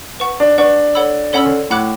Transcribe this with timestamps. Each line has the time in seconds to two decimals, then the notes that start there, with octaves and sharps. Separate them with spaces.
0.20 B4 F#5 C#6
0.40 D4
0.58 D4 B4 F#5 C#6
0.95 A4 C#5 F#5 B5 E6
1.33 C#4 A4 C#5 F#5 B5 E6
1.46 D3
1.70 A2 F#5 B5 D6 F#6